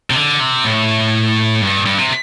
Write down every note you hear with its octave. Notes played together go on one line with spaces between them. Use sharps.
C3
D3
C3
A2
G2
G2
C3